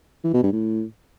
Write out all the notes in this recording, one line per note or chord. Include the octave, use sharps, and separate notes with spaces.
E3
B2
G2
A2